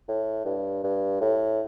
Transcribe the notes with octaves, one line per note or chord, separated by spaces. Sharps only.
A2
G2
G2
A2